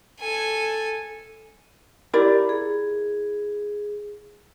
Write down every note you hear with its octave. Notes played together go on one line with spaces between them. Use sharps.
A4 G#5
E4 G4 A#4 D5
G#4